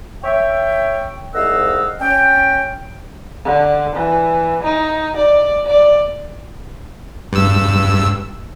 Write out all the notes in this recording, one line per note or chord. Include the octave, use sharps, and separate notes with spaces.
C#5 E5 G5
C2 G#2 D#5 F5 F#5 E6
C#4 G5
D3
E3
D#4
D5
D5
G2 E6